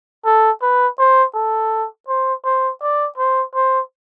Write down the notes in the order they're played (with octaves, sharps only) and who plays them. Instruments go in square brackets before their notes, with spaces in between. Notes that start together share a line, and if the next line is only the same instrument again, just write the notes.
[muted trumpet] A4
B4
C5
A4
C5
C5
D5
C5
C5